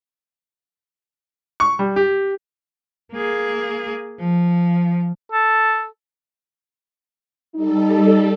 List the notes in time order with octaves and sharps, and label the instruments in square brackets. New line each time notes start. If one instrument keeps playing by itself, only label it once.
[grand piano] C#6
G3
G4
[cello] A#3 G#4
F3
[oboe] A4
[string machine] G3 A4 [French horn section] D#4